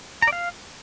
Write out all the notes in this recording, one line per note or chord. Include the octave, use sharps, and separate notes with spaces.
A#5
D5
F5